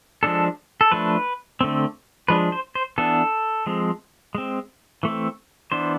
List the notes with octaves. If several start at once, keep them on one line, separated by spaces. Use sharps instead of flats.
F3 G#3 D4 A4
A4
F3 A3 D4 B4
D3 A3 C4
F3 G#3 D4 B4
C5
C5
E3 B3 D4 A4
F3 G#3 C4
G#3 C4
E3 A3 C4
E3 B3 D4 C5